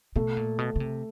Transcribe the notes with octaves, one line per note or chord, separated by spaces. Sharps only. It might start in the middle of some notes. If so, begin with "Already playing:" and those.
B2 A3
A#2
B2
C#3
C3